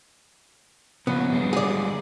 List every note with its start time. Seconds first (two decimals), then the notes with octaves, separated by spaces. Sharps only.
1.07 C#3 F3 B3 C#4
1.30 D3 G3 G#3
1.53 G#4 D5